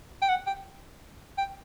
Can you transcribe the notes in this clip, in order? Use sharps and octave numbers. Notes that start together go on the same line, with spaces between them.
G5
F#5
G5
G5